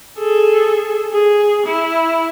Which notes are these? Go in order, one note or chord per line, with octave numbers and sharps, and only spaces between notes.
G#4 A4
G#4
E4